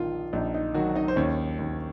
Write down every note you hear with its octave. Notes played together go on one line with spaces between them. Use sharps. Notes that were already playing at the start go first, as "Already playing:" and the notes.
Already playing: A#1 D#3 F4
A#1 D#4
D#4
D#3 F#3 F#4
D#4 D#5
C5
D#2 C#4 C#5
D#2